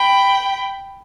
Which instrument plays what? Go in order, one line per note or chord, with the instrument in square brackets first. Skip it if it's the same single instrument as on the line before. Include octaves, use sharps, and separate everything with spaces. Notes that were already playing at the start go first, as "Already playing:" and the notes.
Already playing: [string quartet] G5 B5